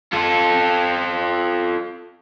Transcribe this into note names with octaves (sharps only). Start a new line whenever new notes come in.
F4 A4